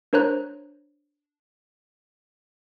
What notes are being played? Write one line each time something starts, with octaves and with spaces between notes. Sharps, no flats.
D4 A#4 C5 C#5 A#5 F#6